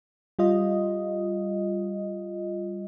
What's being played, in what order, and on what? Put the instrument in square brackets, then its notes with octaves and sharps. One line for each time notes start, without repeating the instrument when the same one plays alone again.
[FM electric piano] G3 F4 D#5